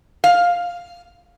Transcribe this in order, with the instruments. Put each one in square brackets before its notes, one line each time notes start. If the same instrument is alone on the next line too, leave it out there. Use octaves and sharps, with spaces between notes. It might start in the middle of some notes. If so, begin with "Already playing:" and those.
[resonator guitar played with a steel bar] F5